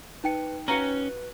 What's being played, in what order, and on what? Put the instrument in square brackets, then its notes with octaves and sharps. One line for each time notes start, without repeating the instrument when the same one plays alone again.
[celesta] D#4 G5 C#7 [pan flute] B4
[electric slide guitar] C#4 [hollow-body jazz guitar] F#4 F5 A#5 [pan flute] B4